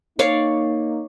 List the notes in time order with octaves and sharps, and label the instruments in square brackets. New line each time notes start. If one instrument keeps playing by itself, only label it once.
[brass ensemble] A#3 D#4 [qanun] C#5 D5 F5